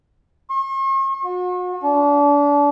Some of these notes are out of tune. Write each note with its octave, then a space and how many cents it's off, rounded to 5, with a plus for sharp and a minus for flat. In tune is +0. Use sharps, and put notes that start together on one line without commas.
C#6 -45
F#4 -40
D4 -30